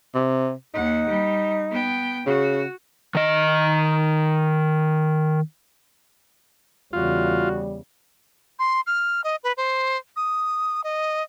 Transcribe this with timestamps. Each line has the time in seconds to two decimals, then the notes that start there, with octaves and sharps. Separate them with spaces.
0.15 C3
0.74 D#2 D#4 F#5
1.09 G3
1.71 B3 G5
2.26 C#3 F#4
3.15 D#3 D#5
6.93 E2 C#3 G3 F4 F#4
8.59 C6
8.87 F6
9.24 D#5
9.44 B4
9.57 C5
10.16 D#6
10.84 D#5